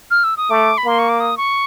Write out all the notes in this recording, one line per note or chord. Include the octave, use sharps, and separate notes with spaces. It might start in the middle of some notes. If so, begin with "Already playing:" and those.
F6
E6
D#6
A3 D6
B5
A#3 C6
C#6
D6
D#6
C#6